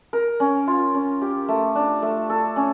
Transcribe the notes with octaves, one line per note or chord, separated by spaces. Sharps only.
A#4
C#4
F4
C#4
G4
A3
D4
A3
A4
C#4